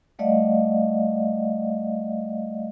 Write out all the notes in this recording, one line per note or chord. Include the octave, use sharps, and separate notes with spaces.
G3 A3 D5 D#5 F5 F#5